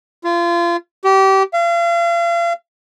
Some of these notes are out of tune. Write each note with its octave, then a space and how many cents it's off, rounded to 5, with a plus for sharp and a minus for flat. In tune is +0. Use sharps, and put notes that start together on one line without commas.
F4 -30
G4 -25
F5 -40